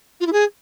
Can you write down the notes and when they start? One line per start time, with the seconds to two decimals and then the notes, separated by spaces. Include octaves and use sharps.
0.20 F4
0.26 E4
0.32 G#4